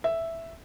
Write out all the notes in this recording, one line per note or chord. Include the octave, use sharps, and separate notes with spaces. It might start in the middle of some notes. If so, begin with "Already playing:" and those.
E5